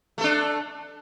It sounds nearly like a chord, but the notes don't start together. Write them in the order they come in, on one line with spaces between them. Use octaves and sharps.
A3 A4 D4